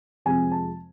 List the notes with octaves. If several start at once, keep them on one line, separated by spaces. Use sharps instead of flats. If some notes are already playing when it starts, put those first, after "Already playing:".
F2 C3 F3 G#3 G#5
A5